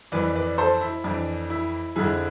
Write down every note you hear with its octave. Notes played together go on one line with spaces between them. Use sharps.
F2 E3 B4 D5
B4 D5
A4 C5
E4
F2 E3 D4
E4
F2 D3 F3 E4 G#4